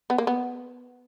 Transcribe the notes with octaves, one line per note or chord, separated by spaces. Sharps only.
B3
A#3
B3